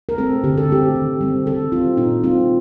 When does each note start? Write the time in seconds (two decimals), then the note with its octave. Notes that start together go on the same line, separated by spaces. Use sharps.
0.09 A#4
0.18 A3 C4 A4
0.44 D3 G4
0.57 A4
0.69 A3 C4 G4
0.95 D#3
1.21 G3 C4
1.46 D#3 A4
1.72 G3 C4 F4
1.97 A#2 D#4
2.23 G3 C4 F4